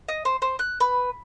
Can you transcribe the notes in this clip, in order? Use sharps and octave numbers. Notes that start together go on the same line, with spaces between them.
D#5
C5
C5
F#6
B4